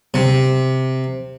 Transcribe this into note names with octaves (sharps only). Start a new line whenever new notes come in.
C3